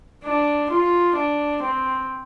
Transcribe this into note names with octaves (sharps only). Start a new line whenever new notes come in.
D4
F4
D4
C4